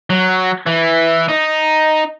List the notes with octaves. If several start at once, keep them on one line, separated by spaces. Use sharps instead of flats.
F#3
E3
D#4